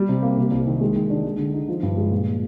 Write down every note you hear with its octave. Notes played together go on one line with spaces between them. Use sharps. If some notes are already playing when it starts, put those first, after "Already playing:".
Already playing: G3
C3
A#3
C3
C2
D#3
G#3
D#3
D4
G#3
D3
D#4
F3
G2
G#3
A#2